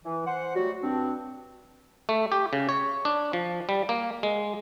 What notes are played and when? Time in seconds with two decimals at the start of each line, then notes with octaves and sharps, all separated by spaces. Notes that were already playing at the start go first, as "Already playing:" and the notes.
0.05 E3
0.27 C5 F#5
0.55 F#3 G3 A3 F#4
0.83 G2 C4 D4
2.09 A3
2.32 G4
2.53 C#3
2.69 C#5
3.05 D4
3.33 F3
3.69 G3
3.89 A#3
4.23 G#3